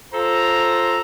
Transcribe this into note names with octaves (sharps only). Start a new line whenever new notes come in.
F4 A4 C5 A#5